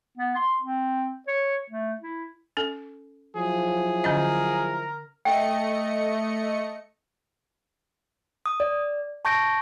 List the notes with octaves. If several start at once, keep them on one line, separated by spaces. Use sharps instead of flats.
B3
C6
C4
C#5
A3
E4
C#4 A4
F3 F#3 E4 G#4
D3 C#4 A#4 D#5
A3 D#5 G5 C#7
D#6
D5
A5 C#6 G6 A#6 D7